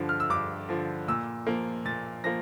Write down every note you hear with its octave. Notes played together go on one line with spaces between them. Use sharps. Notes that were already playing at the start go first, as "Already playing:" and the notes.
Already playing: G2 D3 F3
F6
E6
G2 D6
D3 F3
A#2 E6
F3 A#3
A#2 A6
F3 A#3 A#6